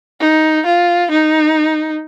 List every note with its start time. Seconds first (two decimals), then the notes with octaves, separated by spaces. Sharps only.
0.20 D#4
0.66 F4
1.11 D#4